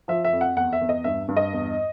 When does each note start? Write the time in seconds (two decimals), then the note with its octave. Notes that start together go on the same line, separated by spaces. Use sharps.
0.08 F3 E5
0.25 E5
0.33 F2
0.41 F#5
0.56 E2 F#5
0.73 E5
0.81 E2
0.89 D#5
1.04 G2 E5
1.28 G2
1.37 D#5
1.53 E2